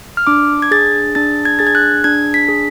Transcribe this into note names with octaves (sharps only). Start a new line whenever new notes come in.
F6
D4 D6
G#6
G#4 A6
D4 A6
G#6
G#4 A6
G#6
F#6
D4 G#6
B6
G#4